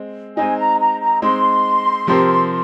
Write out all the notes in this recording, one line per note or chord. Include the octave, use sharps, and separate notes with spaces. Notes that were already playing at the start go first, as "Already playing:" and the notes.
Already playing: G#3 C4
G#3 C4 D#4 G#5
A#5
A#5
A#5
G#3 C4 D#4 C6
C3 F3 C4 G4 A#4